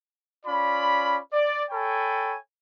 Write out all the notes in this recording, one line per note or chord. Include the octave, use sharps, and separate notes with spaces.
C#4 F4 D5 B5
D5
A4 C#5 G5 G#5 B5